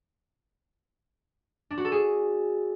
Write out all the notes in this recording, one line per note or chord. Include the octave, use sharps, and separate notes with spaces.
D4
F#4
A4
G#4